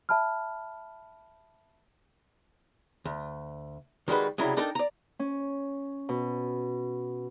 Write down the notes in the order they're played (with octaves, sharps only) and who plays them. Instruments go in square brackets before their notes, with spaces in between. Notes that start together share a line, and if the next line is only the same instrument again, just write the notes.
[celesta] E5 A5 B5 F6
[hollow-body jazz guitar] D2
D#3 G3 G#3 F#4 B4
C2 C#3 F#3 G3 E4
D4 D#4 A4 A#4 G5 A5
D5 A#5
[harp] C#4
B2